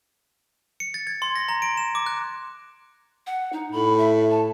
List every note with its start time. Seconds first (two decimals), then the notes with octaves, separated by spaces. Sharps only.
0.80 C#7
0.94 A6
1.07 G#6
1.22 C6
1.36 A#6
1.48 A#5
1.62 D7
1.77 E7
1.95 D6
2.06 F#6
3.27 F#5
3.53 D#4
3.72 A2 B5
3.98 E5
4.31 A5